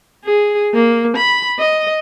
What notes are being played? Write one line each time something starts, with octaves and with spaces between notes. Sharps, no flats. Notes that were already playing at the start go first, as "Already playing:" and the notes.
G#4
A#3
B5
D#5